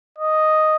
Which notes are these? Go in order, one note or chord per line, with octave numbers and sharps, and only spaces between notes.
D#5